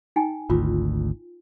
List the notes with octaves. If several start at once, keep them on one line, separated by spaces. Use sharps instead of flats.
D#4 G5 G#5
G#1 D2 F4